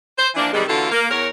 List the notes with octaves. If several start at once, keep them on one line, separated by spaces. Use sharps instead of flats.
C5
E3 F3 A#3 D4
C3 D#3 E3 G3 G#3
D3 E3 A#3 F4 F#4 A4
A#3
E2 A#4 C#5